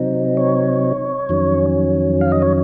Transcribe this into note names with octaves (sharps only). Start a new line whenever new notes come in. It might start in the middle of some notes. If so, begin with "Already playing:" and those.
Already playing: C3 F#3 C4 D#4
C#5
F2 D#3 F#3 C#4
F5
D#5
C#5